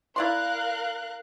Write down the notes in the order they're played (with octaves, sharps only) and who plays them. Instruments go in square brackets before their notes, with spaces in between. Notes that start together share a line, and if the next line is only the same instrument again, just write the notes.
[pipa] E4 D5 C6 [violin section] A#4 F5 F#6